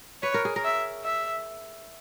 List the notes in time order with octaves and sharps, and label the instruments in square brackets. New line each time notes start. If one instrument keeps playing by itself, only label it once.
[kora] B4 [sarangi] C#5
[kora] A#4
G#4
A#4
[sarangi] E5
E5